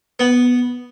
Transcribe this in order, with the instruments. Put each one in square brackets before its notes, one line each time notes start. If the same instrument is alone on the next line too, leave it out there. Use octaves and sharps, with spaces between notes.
[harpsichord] B3